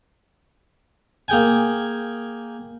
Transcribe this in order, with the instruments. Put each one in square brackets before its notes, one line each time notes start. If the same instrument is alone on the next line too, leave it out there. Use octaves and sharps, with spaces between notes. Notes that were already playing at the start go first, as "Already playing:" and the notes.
[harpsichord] A#3 G#4 G5 G#5